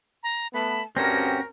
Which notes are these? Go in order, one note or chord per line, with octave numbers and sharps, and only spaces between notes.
A#5
A3 B3 A5 B5
D2 G2 C4 C#4 F#4 A#4 A#6